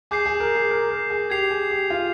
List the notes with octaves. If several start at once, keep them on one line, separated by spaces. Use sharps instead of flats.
G#4 D6 G6 C7
G#4
A#4
G#4
A#4
A#4
G#4
G4 G#6 C7 F7
G#4
G4
F4